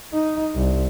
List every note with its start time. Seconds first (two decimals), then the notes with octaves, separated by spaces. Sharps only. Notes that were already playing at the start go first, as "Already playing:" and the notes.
0.14 D#4
0.55 C2